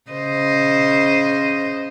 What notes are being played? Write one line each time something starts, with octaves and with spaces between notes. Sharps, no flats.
C#3 C5 D#5